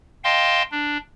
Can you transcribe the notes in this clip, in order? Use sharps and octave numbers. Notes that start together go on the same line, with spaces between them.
D#5 F5 G5 A5 C6
D4